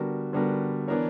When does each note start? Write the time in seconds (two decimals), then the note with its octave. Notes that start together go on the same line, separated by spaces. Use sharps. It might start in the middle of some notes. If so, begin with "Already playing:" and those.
Already playing: D3 G3 B3 F#4 A#4
0.33 D3 G3 B3 F#4 A#4
0.87 E3 B3 D4 A#4 C#5